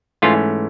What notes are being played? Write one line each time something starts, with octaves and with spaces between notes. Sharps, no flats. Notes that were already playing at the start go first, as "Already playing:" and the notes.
G#2 E3 A3 C#4 F4